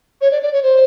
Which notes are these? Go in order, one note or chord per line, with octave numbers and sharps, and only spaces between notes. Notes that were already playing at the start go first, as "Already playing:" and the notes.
C#5
D5
D5
C#5
C5